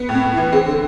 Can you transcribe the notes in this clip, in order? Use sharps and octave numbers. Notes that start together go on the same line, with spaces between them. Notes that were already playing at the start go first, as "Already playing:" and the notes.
Already playing: B3
A2 C4
A2
E4
E3
C4 G#4
D3 A4